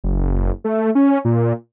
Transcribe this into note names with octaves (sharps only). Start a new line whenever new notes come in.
F#1
A3
C#4
A#2